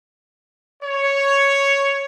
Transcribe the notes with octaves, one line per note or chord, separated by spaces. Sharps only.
C#5